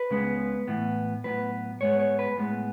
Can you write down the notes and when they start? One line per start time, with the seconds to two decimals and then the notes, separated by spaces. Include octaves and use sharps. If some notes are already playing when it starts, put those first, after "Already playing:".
Already playing: B4
0.11 C#2 C#3 G#3 B3
0.68 A2 E3 B3
1.24 A2 F#3 B3 B4
1.81 G#2 G#3 B3 C#5
2.00 C#5
2.19 B4
2.37 A2 G#3 B3